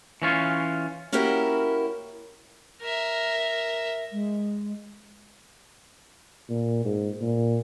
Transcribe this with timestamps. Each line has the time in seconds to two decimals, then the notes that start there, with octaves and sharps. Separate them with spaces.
0.22 E3 C#4 F4 C#5
1.12 A#3 C#4 E4 F#4 G4 A#4
2.82 A#4 E5
4.11 G#3
6.49 A#2
6.85 G#2
7.21 A#2